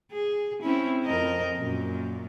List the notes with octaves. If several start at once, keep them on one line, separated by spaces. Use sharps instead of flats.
G#4
C4 C#4 E4
F2 A#4 D#5
F#2 A#2